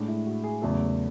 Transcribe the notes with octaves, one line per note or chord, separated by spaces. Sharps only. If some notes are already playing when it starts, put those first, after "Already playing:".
Already playing: A2 G#3 D4
E4
F#4
G#4
E2 C#3 F#3 A3 A4